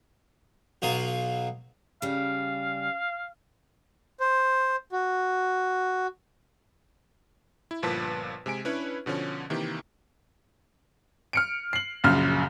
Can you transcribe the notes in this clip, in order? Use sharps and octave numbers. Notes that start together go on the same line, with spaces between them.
B1 B2 F#3 F4 D#6
C#3 G3 F5
C5
F#4
E4
G1 A#2 F3 B4 A5 B6
C3 G#3 G#5 D7
C#4 D4 E4 B4 C#5
B2 D3 F3 C#4
C3 D#3 E3 A#3 G4
F6 C#7 D7
C7 F#7
A#1 F#2 C#3 F6